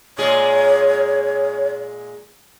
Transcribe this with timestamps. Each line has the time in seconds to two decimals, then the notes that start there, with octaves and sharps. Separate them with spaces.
0.18 A#2 G#3 G#4 C#5